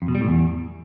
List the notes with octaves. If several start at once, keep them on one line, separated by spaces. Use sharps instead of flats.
F2
B2
G3
A2
E2